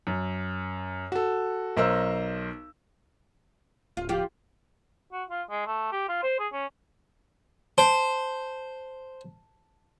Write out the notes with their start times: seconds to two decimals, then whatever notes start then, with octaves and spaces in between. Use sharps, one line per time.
0.07 F#2
1.12 F#4 A4
1.77 B1 A#4 C5 D#5 E6
3.97 D1 F4
4.09 F3 F4 G4
5.13 F#4
5.30 F4
5.50 G#3
5.67 A3
5.92 G4
6.09 F4
6.23 C5
6.40 G#4
6.53 C#4
7.78 C5 A5